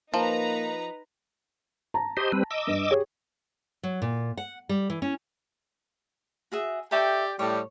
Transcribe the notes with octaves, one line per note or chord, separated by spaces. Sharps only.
F3 A#3 D#4 B4 A#5
A5 A#5
G4 C5 D#5
G3 C4 B4
D#5 D6 E6
G2
G4 G#4 C#5
F#3
A#2
F#5
G3
E3
C#4
F#4 G#4 E5
G4 A4 D5 E5 G5 C#6
A2 G3 C#5